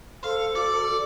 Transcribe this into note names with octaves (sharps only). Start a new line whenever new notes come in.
A4 C5 F5
F#4 D5